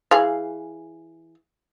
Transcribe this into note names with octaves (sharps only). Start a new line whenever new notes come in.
E3 G#4 F5